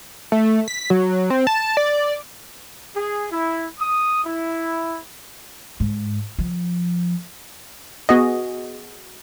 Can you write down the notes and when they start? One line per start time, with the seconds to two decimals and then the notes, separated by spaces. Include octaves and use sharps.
0.32 A3
0.68 B6
0.90 F#3
1.30 C4
1.47 A5
1.77 D5
2.95 G#4
3.31 E4
3.79 D#6
4.24 E4
5.80 G#2
6.39 F3
8.09 B3 F#4 G#4 D#5